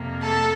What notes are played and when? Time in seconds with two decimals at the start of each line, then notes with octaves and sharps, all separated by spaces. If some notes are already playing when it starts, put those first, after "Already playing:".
Already playing: F2 C3 F3 A#3
0.22 A4 A5